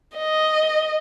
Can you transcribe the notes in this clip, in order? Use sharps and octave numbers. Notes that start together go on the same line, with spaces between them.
D#5